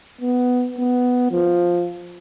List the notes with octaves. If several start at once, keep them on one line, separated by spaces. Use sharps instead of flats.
B3
B3
F3